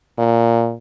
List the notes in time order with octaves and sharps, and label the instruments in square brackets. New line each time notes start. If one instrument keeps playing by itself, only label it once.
[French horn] A#2